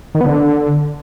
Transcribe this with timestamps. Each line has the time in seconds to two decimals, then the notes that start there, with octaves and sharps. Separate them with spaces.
0.15 D#3
0.21 B3
0.26 D3